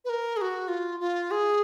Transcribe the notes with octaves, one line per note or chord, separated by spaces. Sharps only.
B4
A#4
G#4
F#4
F4
F4
G#4